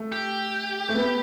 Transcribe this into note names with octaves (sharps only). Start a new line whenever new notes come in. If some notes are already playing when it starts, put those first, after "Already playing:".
Already playing: A3
G4
A3
B3